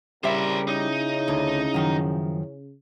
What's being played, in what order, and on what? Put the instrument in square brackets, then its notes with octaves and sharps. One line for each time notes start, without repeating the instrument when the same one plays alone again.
[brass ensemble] C2 [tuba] C#3 [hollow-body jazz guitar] G3 E5 [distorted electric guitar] A#4 C5
[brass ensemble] C#4 E4 [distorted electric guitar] D#4
[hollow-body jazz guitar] D2 D3
F#2 D#3 F3